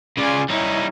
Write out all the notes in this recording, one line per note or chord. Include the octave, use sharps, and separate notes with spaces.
C#3 F4 D5 G#5
G3 D#4 E4 C#5